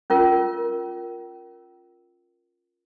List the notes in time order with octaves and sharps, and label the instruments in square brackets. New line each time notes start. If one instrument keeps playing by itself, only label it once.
[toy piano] C#4 F4 A#4